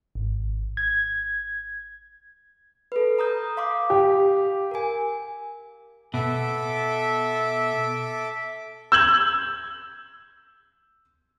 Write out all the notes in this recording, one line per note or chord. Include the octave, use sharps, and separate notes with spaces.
G#1
G#6
A4 B4
A#5 D#6 G6
F5 C6 D6
G4
A#4 G#5
B2 A4 E5 D6
E6 G6 G#6 F#7